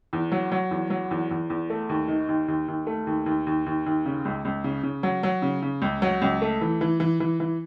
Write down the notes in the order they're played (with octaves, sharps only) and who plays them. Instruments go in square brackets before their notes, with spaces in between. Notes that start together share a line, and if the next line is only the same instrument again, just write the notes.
[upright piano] E2
F#3
F#3
E2
F#3
E2
E2
E2
A3
D#2
D#3
D#2
D#2
D#2
A3
D#2
D#2
D#2
D#2
D#2
C#3
C#2
C#2
C#3
C#3
F#3
F#3
C#3
C#3
C#2
F#3
C#2
A3
E3
E3
E3
E3
E3